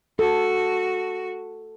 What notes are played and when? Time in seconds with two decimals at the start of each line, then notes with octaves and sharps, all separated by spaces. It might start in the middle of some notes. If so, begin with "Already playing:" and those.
0.19 F#4 A4